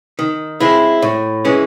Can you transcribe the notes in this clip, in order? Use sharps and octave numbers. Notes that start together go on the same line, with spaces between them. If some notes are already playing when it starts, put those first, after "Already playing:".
D#3
G#3 C4 E4
A2
E3 G#3 C#4